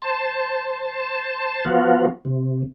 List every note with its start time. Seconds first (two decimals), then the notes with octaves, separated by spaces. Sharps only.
0.02 C5 A5
1.65 F3 B3 F4 F#4
2.25 C3